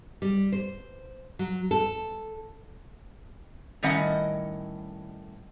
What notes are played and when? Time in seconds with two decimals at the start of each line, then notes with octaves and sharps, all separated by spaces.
0.22 G3
0.52 C5
1.39 F#3
1.71 A4
3.83 A2 D#3 G3 C#4 D#5 F#5